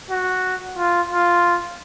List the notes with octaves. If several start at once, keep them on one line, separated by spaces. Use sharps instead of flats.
F#4
F4
F4